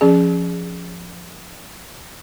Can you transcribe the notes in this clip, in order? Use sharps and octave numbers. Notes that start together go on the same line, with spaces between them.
F3 C#4 G#4